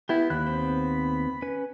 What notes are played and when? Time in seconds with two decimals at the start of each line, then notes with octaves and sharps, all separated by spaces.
0.09 B3 E4 G4
0.30 D#2 B5 F#6
0.47 B3 C4 C5
1.42 C#4 B4